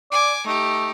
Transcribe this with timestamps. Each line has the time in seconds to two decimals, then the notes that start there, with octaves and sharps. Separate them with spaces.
0.11 D5 G#5 D6
0.46 A3 D#4 G4